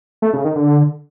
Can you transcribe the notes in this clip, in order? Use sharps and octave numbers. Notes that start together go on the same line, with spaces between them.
A3
C#3
D#3
D3